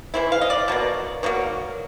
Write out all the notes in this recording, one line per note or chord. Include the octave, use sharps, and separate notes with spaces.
E3 G#3 C4 E4
F5
D#5
D5
B2 F#3 A#3
B2 F#3 A#3